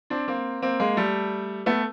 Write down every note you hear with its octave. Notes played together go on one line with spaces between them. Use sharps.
C4 D4
A#3 C4
A#3 C4
G#3 A#3
G3 A3
A3 B3